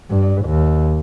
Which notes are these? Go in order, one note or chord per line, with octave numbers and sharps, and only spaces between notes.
G2
D#2